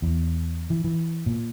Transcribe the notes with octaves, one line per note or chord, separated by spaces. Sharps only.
E2
E3
E3
A#2